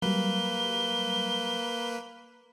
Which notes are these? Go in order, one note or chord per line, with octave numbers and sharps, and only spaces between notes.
F#3 G3 A#3 B4 G7